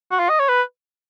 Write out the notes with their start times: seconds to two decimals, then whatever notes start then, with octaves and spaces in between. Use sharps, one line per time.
0.12 F#4
0.19 F4
0.29 D#5
0.39 C#5
0.49 B4